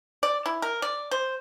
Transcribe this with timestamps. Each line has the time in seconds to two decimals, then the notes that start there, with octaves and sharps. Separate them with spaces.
0.23 D5
0.46 E4
0.62 A#4
0.82 D5
1.11 C5